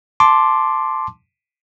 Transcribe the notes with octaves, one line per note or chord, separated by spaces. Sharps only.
A5 C6 D6